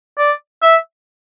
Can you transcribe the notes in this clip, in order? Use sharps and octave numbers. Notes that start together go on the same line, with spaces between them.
D5
E5